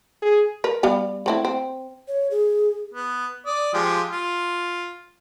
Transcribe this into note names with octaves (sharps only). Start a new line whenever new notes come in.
G#4
A#4 B4
G3 B3 F5
A3 C4 E4
C4
C#5
G#4
B3
D5 D#6
F3 G#3 G4
F4